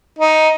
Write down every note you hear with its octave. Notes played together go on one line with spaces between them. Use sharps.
D#4